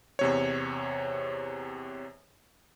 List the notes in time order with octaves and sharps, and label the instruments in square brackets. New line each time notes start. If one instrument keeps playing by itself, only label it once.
[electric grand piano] E2 C3 C#5